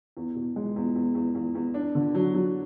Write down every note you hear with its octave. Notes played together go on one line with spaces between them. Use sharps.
E2
B2
G#3
E2
E2
E2
E2
E2
D4
D3
F#3
F#3